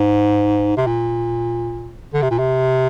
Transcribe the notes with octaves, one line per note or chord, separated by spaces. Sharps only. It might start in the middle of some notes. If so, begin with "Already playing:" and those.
Already playing: G#2
C3
A#2
D3
C3
A#2
C3